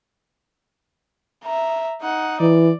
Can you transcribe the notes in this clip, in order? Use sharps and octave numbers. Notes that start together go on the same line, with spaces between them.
E5 A#5
D#4 F#5
E3 D5